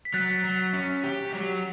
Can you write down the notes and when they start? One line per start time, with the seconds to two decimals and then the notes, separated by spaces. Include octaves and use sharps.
0.05 B6
0.14 F#3 F#6 A6
0.44 F#3
0.73 C#4
1.04 G4
1.33 F#3